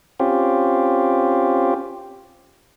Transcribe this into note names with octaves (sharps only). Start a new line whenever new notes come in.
C4 C#4 F4 G4